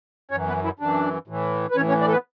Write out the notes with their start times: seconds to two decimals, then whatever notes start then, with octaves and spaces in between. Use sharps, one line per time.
0.31 F#2 E3 C#4 C#5
0.47 B3 B4
0.64 E3 E4
0.79 F#2 E3 D4
1.28 A2 E3
1.71 B4
1.77 A2 E3 C#4 C#5
1.89 C#4 C#5
2.01 D4 D5
2.08 A4
2.12 B3 B4